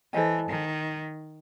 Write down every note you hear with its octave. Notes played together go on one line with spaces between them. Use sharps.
E3 A4 C5 D#5 G#5
D#3